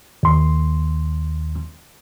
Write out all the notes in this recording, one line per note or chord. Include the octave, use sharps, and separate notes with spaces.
D#2 C6